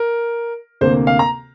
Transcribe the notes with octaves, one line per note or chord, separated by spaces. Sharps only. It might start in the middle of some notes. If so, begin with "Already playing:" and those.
Already playing: A#4
D2 C3 A#3 C5
F5
A#5